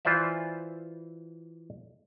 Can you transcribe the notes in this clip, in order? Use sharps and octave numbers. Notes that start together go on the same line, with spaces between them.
E3 F4 C5 D5 E5